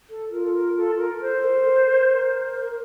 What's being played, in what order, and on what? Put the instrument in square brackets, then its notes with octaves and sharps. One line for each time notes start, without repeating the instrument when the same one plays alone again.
[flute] A4
[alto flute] F4 [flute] A#4
[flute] A4
A#4
A4
A#4
[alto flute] A4 [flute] C5
[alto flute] A#4
A4
A#4
A#4
A#4